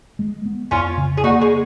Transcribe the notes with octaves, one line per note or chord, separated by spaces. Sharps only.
G#3
B3
F2 C#4 F4
C#3
G#4
A#3 D#4 F#4
G#3